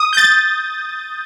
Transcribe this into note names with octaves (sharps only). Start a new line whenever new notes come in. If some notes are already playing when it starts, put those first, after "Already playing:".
Already playing: D#6
G6
A6